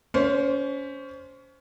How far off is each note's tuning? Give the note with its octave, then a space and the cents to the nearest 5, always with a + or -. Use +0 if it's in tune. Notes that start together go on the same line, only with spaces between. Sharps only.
C#4 +25 C5 +0